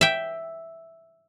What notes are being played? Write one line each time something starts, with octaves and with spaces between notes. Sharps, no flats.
E5 G5